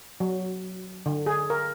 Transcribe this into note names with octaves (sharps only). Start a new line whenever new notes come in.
F#3
D3
G#4
A#4